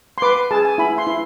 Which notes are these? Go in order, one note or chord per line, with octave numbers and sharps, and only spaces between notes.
C6
B4 D6
G#4 A5
G#5
E4 B5
C6
E4